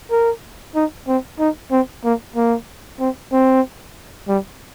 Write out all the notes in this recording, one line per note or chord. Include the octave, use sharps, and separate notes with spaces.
A#4
D#4
C4
D#4
C4
A#3
A#3
C4
C4
G3